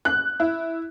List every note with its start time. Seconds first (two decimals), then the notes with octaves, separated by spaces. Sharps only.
0.05 F#6
0.40 E4